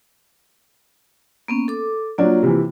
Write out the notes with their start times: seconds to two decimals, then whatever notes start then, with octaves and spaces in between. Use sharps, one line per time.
1.48 A#3 B3 C#4
1.68 A4 D6
2.18 F#3 A#3 D4 F4
2.43 C3 E3